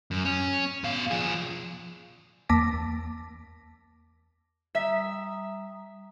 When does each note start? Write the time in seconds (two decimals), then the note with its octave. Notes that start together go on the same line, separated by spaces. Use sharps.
0.11 F#2
0.25 C#4
0.84 B2 F5
1.11 F3 G#4
2.49 E2 A#3 A5 D6 A#6 B6
4.75 G3 E5 A#5 D#6